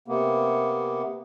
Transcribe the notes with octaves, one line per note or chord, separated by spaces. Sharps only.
C3 A#3 B3